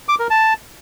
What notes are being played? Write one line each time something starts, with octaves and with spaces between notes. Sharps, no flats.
D6
A#4
A5